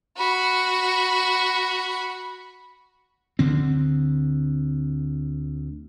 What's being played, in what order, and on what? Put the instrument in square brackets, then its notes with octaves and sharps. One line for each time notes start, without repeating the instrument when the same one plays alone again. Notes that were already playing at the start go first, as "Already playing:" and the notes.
[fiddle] F#4 B5
[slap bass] D2 D3 C4